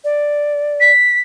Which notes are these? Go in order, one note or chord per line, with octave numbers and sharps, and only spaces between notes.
D5
B6